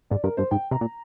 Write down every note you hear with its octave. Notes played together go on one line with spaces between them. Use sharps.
G#2 D5
G2 A#4
G2 C5
G#2 G5
C3 A#5
A#2